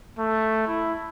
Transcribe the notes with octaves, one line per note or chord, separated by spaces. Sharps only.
A3
E4